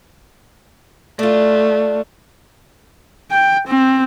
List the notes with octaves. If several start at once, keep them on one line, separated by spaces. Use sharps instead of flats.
A3 D4 F4
G5
C4